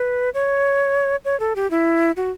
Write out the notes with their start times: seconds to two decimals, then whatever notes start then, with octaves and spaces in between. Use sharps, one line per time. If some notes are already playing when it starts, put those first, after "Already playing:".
Already playing: B4
0.34 C#5
1.25 C#5
1.40 A4
1.56 G4
1.71 E4
2.17 F#4